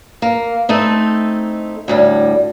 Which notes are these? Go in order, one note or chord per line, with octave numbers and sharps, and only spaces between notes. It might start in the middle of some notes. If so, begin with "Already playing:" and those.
A#3
A3 C4 D#4 E4
D2 A2 G3